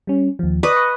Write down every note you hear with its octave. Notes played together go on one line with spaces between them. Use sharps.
G3 C#4
D#2 F3
B4 D5 D#5 C#6
C#6